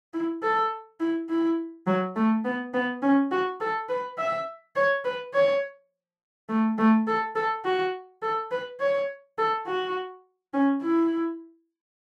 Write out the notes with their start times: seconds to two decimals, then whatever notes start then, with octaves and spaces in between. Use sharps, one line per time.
0.14 E4
0.43 A4
1.00 E4
1.29 E4
1.87 F#3
2.16 A3
2.45 B3
2.74 B3
3.02 C#4
3.31 F#4
3.61 A4
3.89 B4
4.18 E5
4.76 C#5
5.05 B4
5.34 C#5
6.49 A3
6.78 A3
7.07 A4
7.36 A4
7.65 F#4
8.22 A4
8.51 B4
8.80 C#5
9.38 A4
9.67 F#4
10.53 C#4
10.82 E4